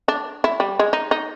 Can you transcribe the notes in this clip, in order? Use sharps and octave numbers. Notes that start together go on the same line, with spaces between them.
D4
E4
G3
G#3
D#4
D#4